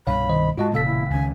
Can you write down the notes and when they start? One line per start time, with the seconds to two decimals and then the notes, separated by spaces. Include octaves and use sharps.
0.07 C2 G2 B2 C#5 F5 B5
0.29 D#3 C5 D#5
0.58 G#2 G#3 F4 F#4 D#5 A5
0.74 E1 A#2 C#3 A4 F5 B6
0.86 E4
1.10 C#2 D#3 C#4 G#5